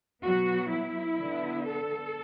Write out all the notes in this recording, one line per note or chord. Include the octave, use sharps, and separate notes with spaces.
B2 F#3 B3 F#4
E4
D3 B3
A4